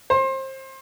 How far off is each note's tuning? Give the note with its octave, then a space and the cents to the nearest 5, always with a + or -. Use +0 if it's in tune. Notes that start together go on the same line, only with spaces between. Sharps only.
C5 +30